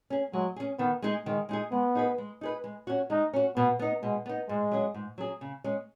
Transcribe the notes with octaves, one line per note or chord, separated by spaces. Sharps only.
C#4 G#4
F#3 G#3
C#4 G#4
D#3 B3
G#3 D#4 G#4
D#3 G#3
G#3 D#4 G#4
G#3 B3
D#4 G#4 B4
G#3
D#4 G#4 B4
G#3
C#4 F#4
G#3 D#4
C#4 F#4
B2 B3
B3 D#4
B2 G#3
B3 D#4
G#2 G#3
F#3 C#4 G#4
G#2
F#3 C#4 G#4
C#3
G#3 C#4